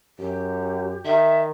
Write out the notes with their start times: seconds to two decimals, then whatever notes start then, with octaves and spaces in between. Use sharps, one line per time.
0.19 F#2 G4
1.05 D#3 E5